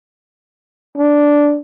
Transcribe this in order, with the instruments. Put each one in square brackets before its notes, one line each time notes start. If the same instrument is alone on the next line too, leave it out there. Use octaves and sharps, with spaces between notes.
[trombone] D4